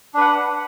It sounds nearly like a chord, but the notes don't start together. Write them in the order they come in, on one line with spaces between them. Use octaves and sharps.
D4 B4 F#5